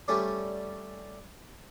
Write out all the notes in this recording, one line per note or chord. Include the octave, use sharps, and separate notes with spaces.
G3 A3 C#4 G4 D5